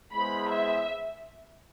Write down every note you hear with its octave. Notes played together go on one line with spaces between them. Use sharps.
G#3 B3 E4 G#4 C5 B5
E5